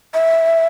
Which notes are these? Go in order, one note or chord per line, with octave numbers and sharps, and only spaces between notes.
E5